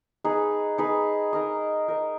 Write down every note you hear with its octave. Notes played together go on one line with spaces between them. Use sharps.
D#4 G#4 B4
D#4 G#4 B4
D#4 A#4 D#5
D#4 A#4 D#5